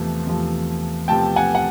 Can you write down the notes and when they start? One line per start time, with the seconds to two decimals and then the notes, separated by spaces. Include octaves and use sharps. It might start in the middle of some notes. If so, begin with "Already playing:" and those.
Already playing: E2 C3 F3 A3
0.27 E2 C3 F3 A3
1.08 E2 C3 F3 A3 G5 A5
1.36 F#5 G#5
1.55 F#5